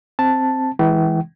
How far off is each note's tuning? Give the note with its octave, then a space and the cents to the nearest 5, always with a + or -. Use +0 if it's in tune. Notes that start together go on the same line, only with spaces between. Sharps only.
C4 +0 A5 +0
E3 -15 G#3 +0 G5 -45